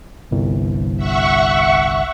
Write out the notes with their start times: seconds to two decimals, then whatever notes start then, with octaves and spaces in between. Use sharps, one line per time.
0.31 G1 C2
0.97 E5 F#5 C#6